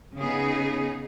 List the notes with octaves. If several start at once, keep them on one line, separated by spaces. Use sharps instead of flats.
C#3 B3 D#4 G#4